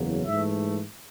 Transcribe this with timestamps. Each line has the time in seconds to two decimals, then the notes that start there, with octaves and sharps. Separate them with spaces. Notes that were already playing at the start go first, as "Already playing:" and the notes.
Already playing: F#1 E2 C#3 F#3
0.27 G#2 E3 A3 E5